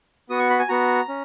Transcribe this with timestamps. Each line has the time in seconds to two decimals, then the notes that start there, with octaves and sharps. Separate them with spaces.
0.29 B3 F#4 D#6
0.39 C#6
0.50 B5
0.59 G#5
0.69 B3 F#4 A#5
1.09 C#4